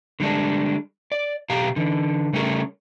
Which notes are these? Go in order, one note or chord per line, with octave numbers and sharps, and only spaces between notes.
D3 G3 G#3 D4
D5
B2 G4 F5 A#5
D3 E3
C#3 G3 A3 C#4 G#4 A#4